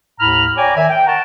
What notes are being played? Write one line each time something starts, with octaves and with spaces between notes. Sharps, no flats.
D#2 A2 A#5 B5 F6
C#5 D5 G5 G#5 A#5 D6
D#3 E5 G#5
G5
A#4 C#5 F#5 G5 A5 A#5